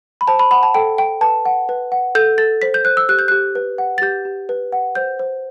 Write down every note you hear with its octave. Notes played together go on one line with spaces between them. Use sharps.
B5
C5 A5
B5
F#5 B5
A5
A4 G5
G5
B4 A5
F#5
B4
F#5
A4 G6
A4 A6
C5 B6
G6
C5 F#6
E6
G4 F#6
G6
G4 F#6
B4
F#5
A6
G4 G6
G4
B4
F#5
C5 G6
C5